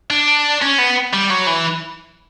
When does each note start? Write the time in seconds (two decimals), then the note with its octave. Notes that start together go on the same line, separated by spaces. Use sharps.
0.10 D4
0.62 C#4
0.79 B3
1.14 G3
1.30 F#3
1.47 E3